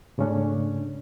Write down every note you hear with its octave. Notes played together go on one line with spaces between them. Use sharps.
G#2 C#3 A3 C#4 D4